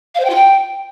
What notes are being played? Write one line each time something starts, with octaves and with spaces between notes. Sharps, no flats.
F5
C5
G5
F4
G5